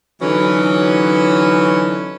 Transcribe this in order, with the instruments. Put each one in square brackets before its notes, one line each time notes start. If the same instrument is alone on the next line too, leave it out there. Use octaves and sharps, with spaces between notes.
[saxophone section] D3 E3 F#3 C#4 D#4 B4